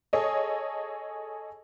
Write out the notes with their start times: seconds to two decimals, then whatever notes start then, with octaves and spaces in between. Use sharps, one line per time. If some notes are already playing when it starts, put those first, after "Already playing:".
0.13 G#4 A4 C#5 D#5